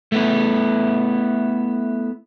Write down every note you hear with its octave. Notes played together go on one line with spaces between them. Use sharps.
A3 B3 E4